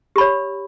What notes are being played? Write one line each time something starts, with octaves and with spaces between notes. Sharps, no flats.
G4 C#5 B5